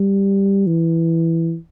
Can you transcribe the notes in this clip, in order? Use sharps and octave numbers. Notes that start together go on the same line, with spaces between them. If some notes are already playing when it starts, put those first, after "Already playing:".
Already playing: G3
E3